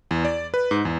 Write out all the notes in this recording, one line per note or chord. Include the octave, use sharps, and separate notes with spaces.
E2
D5
B4
G#2
E2